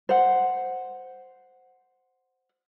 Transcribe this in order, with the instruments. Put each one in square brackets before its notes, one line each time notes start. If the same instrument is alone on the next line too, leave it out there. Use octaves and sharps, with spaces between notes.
[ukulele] C5 F#5